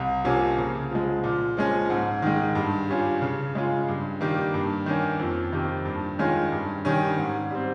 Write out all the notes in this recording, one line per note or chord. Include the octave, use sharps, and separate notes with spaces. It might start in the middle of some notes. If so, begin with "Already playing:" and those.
Already playing: C2
C3 F3 A#3 C#4
C#3
F3 G#3
A#2
F3 G#3 C#4
G#2
D#3 G#3
G2
G3 C#4 F4
C#3
G#3 C#4 F4
G2
D#3 G3 A#3
G2
D#3 A#3 C#4
F2
C3 D#3 A#3
G2
D#3 G#3 C#4 F4
G2
D#3 G3 C#4
G#2
G3 C4